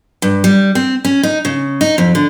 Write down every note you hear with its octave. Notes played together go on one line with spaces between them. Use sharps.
G2
G3
C4
C#4
D#4
C#3
D#4
F2
D3